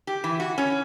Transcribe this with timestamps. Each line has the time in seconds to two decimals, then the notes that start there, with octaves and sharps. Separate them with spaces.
0.07 G4
0.24 E3
0.40 F#4
0.58 C#4